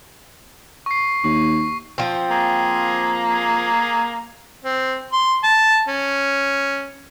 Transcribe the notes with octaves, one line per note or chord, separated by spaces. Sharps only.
C#6 C7
D#2 C#6
F3 C4
A#3 G#4
G#4
C4
C6
A5
C#4